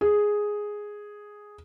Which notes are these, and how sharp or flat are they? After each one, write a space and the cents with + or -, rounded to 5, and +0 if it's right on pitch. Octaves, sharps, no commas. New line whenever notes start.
G#4 +0